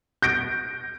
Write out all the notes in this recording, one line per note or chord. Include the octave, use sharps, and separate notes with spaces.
G6 A#6 D7